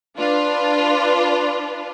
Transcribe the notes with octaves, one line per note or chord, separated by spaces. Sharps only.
D4 F4 B4